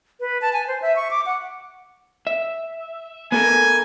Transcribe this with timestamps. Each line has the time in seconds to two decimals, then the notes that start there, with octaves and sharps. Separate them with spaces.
0.20 B4
0.42 A5
0.53 G#5
0.68 C5
0.82 E5
0.96 C#6
1.11 D6
1.26 F#5
2.27 E5
3.32 B3 A4 A#4 G#5